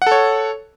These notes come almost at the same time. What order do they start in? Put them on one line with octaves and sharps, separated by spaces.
F#5 A4 C#5